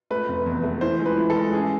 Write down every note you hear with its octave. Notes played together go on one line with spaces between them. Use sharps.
A3 B4
F1
E2
A3
E3 C5
G#3
B4
E3
A4
G#3
A1 G#4